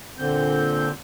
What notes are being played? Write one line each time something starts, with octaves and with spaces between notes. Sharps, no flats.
A#2 D3 C4 G6